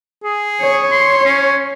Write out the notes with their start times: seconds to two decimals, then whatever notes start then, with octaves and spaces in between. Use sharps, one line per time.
0.24 G#4
0.62 C#5
0.92 C6
1.25 C#4